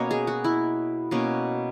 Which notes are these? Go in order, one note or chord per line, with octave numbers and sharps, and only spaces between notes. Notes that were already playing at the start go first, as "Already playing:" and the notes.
Already playing: B2 A#3 C#4 C#5 D#5
G#4
F#4
E4
B2 A#3 C#4